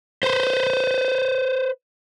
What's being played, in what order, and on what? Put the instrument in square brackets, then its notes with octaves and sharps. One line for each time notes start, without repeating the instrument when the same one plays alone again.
[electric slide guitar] B4 C5